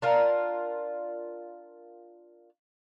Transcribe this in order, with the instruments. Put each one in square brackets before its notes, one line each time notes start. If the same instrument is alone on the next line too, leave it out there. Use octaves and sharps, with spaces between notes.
[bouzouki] D4 F4 A#4